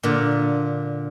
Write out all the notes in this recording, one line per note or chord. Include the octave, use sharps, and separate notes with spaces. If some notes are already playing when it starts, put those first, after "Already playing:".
A#2 D3